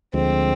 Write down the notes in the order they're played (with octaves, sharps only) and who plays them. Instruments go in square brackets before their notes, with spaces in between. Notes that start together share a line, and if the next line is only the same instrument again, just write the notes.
[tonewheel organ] D2 D3 F3 G#3 [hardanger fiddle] C4